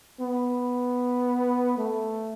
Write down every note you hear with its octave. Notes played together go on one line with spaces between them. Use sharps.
B3
A3